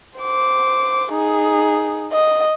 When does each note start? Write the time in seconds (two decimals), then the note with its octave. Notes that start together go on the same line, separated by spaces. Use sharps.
0.18 C5 D6
1.12 D#4 G#4
2.13 D#5